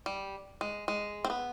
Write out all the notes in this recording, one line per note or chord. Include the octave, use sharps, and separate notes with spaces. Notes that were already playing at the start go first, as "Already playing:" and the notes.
G3
G#3
G#3
C4
B3